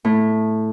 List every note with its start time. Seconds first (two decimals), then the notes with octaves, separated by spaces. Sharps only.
0.05 A2